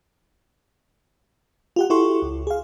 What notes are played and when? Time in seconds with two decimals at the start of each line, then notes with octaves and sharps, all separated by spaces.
1.76 F4 G4 F#5
1.90 E4 F#4 G4 A4 C6 C#6
2.22 C#2
2.47 G#4 F5